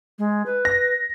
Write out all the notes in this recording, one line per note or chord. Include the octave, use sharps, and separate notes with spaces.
G#3
B4
A#6